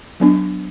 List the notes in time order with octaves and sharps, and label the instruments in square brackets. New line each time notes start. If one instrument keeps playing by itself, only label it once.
[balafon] F#3 B3 D4